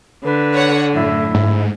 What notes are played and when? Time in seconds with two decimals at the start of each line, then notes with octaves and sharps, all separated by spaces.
0.24 D3 B4
0.54 C#5 F#5
0.94 F#2 A2 E4
1.34 G#2